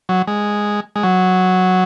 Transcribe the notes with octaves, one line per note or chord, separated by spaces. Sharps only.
F#3
G#3
G#3
F#3